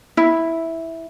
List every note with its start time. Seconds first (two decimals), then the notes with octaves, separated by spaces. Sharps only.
0.17 E4